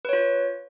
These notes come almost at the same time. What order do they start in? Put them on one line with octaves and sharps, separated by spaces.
B4 C#5 F4